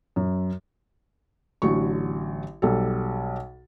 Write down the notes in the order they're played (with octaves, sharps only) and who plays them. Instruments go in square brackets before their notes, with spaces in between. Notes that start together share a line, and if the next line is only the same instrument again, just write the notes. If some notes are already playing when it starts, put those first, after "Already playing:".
[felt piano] F#2
A1 D3 F#3 C#6
B1 G3 A4